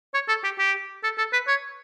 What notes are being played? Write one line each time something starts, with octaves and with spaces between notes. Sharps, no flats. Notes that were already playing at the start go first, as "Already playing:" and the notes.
C#5
A4
G4
G4
A4
A4
B4
C#5